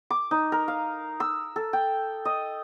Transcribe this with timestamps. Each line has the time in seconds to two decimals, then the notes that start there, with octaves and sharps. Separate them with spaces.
0.10 D6
0.31 D#4
0.52 A#4
0.68 F5
1.20 E6
1.56 A4
1.73 G5
2.25 D#5